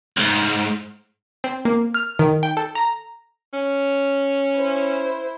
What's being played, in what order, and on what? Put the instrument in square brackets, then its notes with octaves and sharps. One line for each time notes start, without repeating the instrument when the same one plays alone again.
[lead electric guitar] C#2 G#2
[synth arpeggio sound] C4
A#3
F6
D#3
G5
A4
A#5
[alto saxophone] C#4
[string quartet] E4 C5